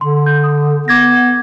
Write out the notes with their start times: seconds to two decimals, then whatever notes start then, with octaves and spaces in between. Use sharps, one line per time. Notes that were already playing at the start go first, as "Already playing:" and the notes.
0.01 D3 C6
0.26 G6
0.44 D#6
0.88 B3 D6 G#6 A#6